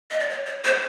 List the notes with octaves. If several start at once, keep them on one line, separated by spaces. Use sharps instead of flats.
D#5
D5
C#5
C#5
C5